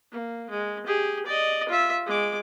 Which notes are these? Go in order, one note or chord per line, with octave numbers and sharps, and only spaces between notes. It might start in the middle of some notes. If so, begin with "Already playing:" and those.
A#3
G#3
G4 G#4
D5 D#5
F4 E5
G#3 D6